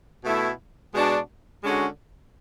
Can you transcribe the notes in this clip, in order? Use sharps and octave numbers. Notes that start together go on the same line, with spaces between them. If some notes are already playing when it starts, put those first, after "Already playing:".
B2 A3 E4
B2 G#3 D4 F#4
D3 G#3 C#4 F#4